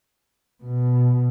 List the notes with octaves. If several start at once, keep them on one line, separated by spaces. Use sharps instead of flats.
B2